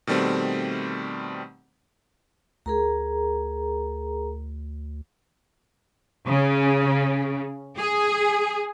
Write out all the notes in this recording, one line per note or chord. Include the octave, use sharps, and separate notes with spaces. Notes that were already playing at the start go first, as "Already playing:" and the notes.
B2 D#3 G3 A3 C4
D2 G#4 A#4 A#5
C#3
G#4